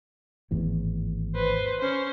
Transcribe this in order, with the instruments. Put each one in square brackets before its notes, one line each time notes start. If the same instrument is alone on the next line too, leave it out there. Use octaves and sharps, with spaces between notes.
[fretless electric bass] G#1 E2 A2
[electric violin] B4 C5
C#4 C5